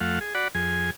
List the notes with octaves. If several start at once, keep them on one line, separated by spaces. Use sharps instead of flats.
F2 A3 F5 F#5
G#4
F#4 D5 F#5 B5
F2 G#4 G#5